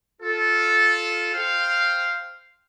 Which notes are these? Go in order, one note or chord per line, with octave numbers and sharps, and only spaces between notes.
F4 A4
C5 F5 G5 C6